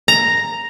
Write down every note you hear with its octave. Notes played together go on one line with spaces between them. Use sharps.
A#5